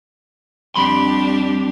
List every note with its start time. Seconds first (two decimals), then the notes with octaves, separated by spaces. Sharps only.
0.76 F2 G3 D4 G4 B5 C6